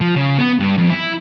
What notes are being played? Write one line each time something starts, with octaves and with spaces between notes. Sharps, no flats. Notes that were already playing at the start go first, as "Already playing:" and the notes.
F3
C#3
B3
G2
F2
E4